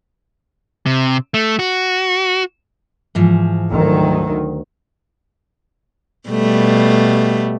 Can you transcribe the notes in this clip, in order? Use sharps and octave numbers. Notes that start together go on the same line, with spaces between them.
C3
A3
F#4
G#2 E3 F3
D2 D#3 F#3
B2 G3 A3